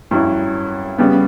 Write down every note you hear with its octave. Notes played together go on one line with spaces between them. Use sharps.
G2 F#3 C#4 E4
C#3 G3 B3